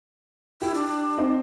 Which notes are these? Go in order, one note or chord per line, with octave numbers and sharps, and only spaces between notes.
E4 G4
D4
C4 D#4 C5